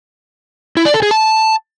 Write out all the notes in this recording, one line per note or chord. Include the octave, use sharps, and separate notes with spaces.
E4
D5
A4
G#4
A5